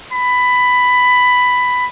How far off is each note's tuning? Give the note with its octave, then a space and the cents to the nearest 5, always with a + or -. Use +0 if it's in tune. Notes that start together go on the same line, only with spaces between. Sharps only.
B5 +10